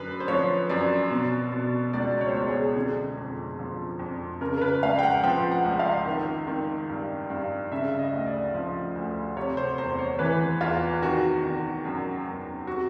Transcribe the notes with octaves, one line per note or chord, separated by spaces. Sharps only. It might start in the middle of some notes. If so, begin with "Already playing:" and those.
Already playing: F#2 D3 B4
C5
F3 C#5
F#2 D5
B2
B2
C#2 D5
C#5
C5
C#2 C#5
G#4
D3 G#4
F2
F3
F2
C#3 A#4
A#4
B4
C#2 F5
G5
F#5
F3 G5
F#5
C#2
F5
D#3
D#3
G2
G2
C#3 E5
D#5
D2
D5
F3
D2
C3 C#5
C5
E2 C5
C#5
E3 B4
E2 F4
D#3 F#4
D#3
F#2
F#2
C3 F#4